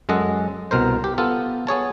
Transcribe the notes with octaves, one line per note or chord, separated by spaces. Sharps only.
F#2 G#3 A4 D#5 F#5
C2 B2 A#4 C5
G4
B3 F4 A4
B3 G#4 C#5 A5